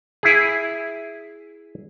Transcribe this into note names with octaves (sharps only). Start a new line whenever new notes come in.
E4 G#4